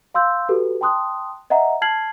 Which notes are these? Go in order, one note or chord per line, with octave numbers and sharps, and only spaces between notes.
F5 C6 E6 G6
F#4 G4 A4 B4
G5 A5 C6 D#6 F#6
D#5 E5 F#5 A#5
A5 F6 G#6 C7 F#7